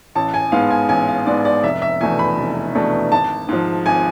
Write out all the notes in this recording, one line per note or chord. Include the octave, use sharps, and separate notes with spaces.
A1 A5
G#5
G#2 G#3 B3 F5
G#5
A1 G#5
F5
G#2 G#3 B3 D5
D5
F1 E5
E5
E2 B2 A3 D4 G#5
B5
F1
E2 B2 A3 D4
G#1 A5
G#2 F3
G#1 G#5